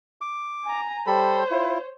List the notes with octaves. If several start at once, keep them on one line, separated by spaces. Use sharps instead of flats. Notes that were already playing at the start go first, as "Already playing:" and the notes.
D6
G#5 A#5
G3 A4 C5 C#5 B5
E4 F4